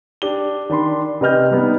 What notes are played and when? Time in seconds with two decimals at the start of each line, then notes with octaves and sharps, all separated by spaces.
0.22 D4 G4 G7
0.69 D#3 D4 B5 C6
1.21 C3 B4 D#5 F6 G6
1.51 G3 B3 D#4